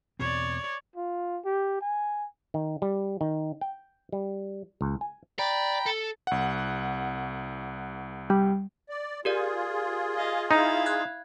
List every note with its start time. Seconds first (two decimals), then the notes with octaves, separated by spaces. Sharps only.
0.19 E2 B2 C4 C#5 D5
0.96 F4
1.45 G4
1.81 G#5
2.54 D#3
2.82 G3
3.21 D#3
3.61 G5
4.12 G3
4.81 C#2
5.01 G#5
5.39 D5 G5 A#5 B5
5.86 A4
6.27 C2 F#5
8.30 G3
8.89 D5
9.25 F4 G4 G#4 A#4 D5
10.17 D#5 F5
10.51 D#4 E4 F5
10.86 F#6 G#6